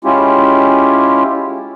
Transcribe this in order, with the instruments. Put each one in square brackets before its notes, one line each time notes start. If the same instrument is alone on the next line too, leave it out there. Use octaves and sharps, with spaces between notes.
[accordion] G#3 C#4 E4 F4 G4